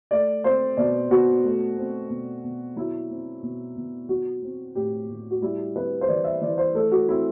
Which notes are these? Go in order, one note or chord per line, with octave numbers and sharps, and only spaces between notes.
A3 D5
C4 C5
B2 D5
B2 F#4
A3
C4
B2
B2
F#3 E4
C4
B2
B2
F#3 F#4
C4
A2 G4
A2
F#4
G3 E4
C4 B4
C5
E3 D5
E5
E3 D5
C5
A3 A4
F#4
C4 E4